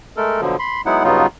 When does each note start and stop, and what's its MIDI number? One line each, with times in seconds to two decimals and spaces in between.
0.17 0.41 56
0.17 0.41 57
0.17 0.41 69
0.17 0.41 70
0.41 0.56 47
0.41 0.56 50
0.41 0.56 53
0.41 0.56 54
0.59 0.81 83
0.59 0.81 84
0.86 1.03 54
0.86 1.03 56
0.86 1.03 59
0.86 1.03 63
0.86 1.03 64
0.86 1.03 78
1.04 1.27 43
1.04 1.27 49
1.04 1.27 54
1.04 1.27 59
1.04 1.27 63
1.04 1.27 65